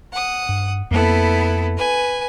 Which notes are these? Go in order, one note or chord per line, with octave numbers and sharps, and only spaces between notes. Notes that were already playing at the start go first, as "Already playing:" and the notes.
F#5 D#6
G2
F2 A#3 B3 E4 A4
B4 G#5